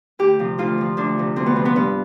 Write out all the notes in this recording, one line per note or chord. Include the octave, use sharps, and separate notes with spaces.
D2 G4
C3 F3
D2 F4
C3 F3
D2 D4
C3 F3
D2 C4
B3
C3 F3
B3
G2 B3